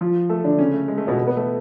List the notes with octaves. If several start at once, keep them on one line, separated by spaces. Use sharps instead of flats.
F3 F4
A3 A4
D3 D4
C#3 C#4
A3
G#3
A3
B2 B3
B3 B4
A3 A4